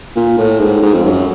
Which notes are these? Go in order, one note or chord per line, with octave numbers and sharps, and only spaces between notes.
A#2
A2
G#2
G#2
F2
F#2